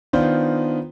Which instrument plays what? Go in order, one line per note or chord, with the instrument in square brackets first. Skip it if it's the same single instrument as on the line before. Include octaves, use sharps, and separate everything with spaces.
[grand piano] D#3 B3 D4 F4 C5